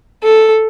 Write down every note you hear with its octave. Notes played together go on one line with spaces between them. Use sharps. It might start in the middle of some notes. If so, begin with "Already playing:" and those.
A4